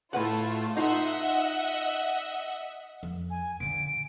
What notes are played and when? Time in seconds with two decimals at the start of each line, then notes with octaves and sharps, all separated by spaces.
0.13 A2 A3 F4 B4 F#5
0.77 D#4 F4 D#5 E5 F#5
3.03 F2
3.30 G#5
3.60 A#2 D3 D7